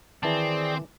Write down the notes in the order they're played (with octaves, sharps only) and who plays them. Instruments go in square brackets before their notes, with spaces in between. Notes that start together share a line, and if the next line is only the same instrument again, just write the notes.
[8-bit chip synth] D#3 [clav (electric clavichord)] E3 A5 [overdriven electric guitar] C4 [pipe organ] G#4 D5